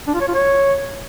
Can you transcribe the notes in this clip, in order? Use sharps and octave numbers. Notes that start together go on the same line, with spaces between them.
D4
F4
C#5
F4
C#5